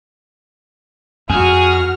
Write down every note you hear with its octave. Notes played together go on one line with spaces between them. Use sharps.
F2 F#4 G#4 F6